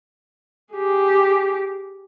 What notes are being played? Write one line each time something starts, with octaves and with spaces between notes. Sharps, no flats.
G4 G#4